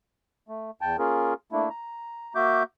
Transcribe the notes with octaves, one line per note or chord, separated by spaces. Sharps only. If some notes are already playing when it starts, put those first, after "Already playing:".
A3
E2 G5 A5
A#3 C#4 F4 G#4 A#4
A3 A#3 D4 E4
A#5
A#3 F#4 E5 D6 G6